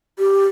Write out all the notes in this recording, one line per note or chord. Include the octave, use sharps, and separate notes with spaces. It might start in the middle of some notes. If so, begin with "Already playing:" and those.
G4